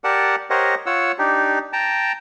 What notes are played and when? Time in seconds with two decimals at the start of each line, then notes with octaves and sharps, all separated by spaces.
0.04 G4 A#4 D5 F#5 A5
0.50 G4 A#4 C5 C#5 D#5 F#5
0.86 F4 C#5 F#5 E6
1.19 D4 D#4 G4
1.73 G5 A5 A#5